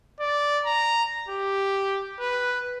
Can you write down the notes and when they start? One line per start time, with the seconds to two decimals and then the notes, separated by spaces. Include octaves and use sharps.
0.20 D5
0.65 A#5
1.29 G4
2.20 B4